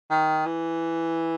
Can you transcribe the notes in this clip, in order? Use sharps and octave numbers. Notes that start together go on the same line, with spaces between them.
D#3
E3